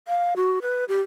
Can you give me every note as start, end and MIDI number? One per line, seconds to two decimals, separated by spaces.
0.08 0.34 77
0.36 0.59 66
0.62 0.85 71
0.89 1.01 67